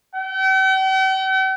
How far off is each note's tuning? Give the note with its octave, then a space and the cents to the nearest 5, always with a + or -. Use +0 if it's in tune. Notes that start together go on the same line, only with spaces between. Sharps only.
G5 -45